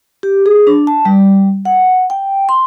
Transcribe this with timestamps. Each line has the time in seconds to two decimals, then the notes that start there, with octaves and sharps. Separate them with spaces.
0.23 G4
0.46 G#4
0.67 D4
0.87 A5
1.05 G3
1.65 F#5
2.10 G5
2.49 C6